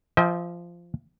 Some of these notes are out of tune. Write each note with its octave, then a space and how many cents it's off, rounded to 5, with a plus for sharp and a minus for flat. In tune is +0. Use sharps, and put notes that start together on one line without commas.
F3 -15 D#5 +45 G5 +15